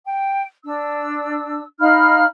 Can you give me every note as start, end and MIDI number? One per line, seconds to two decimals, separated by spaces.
0.06 0.41 79
0.64 1.63 62
0.64 1.63 88
1.79 2.25 63
1.79 2.25 77
1.79 2.25 83
1.79 2.25 89